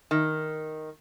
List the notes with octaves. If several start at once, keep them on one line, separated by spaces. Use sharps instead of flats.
D#3